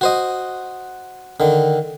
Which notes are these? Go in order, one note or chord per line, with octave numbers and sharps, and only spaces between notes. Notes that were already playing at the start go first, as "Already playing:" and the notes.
F#4 C5 D#5
D3 D#3